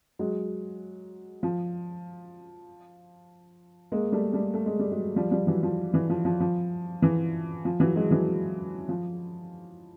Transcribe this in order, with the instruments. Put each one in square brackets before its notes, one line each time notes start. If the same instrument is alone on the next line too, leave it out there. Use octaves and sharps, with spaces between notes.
[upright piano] F#3 G#3
F3
G#3 A#3
G3 A3
G3 A3
A3
G#3
G3
F#3 G#3
F3 G3
F3 G3
E3 F#3
F3
E3
F3
F3
F3
E3
F3
E3 F#3
F#3 G#3
E3 F#3
F3